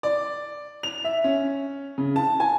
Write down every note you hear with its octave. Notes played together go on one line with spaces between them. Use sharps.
D5
F7
E5
C#4
C#3
A5
G#5